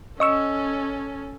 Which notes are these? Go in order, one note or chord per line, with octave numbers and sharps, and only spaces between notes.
C#4 A4 D#5 C#6 E6